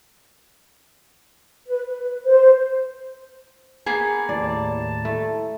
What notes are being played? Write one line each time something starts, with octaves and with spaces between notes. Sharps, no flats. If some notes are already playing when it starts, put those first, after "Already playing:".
B4
B4
C5
A#3 B3 G#4
D#2 A2 D5 A5
A3 E4